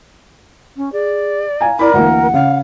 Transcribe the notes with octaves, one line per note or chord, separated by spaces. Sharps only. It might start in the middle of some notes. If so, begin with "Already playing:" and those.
C#4
G#4 D5
F5 G#5 A#5
E4 A#4 D5 B5
D2 E3 A#3 F#5
C#3 F5